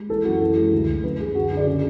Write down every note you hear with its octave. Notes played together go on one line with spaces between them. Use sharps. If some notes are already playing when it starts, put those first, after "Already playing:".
Already playing: G#3
E3 A4
F#2 F#4
E3 A4
G#3
D2
D2
F#2 B4
F#2 G#4
D3 F#4
G#4
D3
D5
C#3 G#4